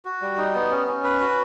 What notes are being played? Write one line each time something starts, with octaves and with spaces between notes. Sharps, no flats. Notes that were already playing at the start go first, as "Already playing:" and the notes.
F#4
G3
D#4
B3
C#4
C#4
B4
F#4